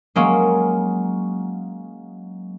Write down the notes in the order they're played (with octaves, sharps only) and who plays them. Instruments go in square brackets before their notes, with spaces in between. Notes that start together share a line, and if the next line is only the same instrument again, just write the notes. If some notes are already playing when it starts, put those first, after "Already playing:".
[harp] F#3 G#3 A#3 C#4